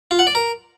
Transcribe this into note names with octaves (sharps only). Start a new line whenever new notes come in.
F4
F#5
D5
A#4